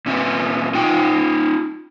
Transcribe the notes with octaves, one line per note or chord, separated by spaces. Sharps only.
A#2 C#4 E5
D#4 F4 G5